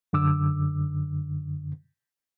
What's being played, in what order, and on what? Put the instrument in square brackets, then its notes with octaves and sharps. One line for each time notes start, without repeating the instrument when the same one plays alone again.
[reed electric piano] F#2 D3 D6 E6